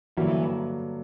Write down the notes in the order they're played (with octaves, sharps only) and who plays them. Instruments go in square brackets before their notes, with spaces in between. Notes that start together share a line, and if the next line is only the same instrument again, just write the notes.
[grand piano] G2 D3 F#3 A#3 [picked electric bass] E3